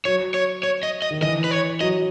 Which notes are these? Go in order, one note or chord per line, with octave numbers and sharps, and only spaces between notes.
F#3 C#5
C#5
C#5
D#5
D#5
D#3
E3 D#5
B4
C#5
F#3 D#5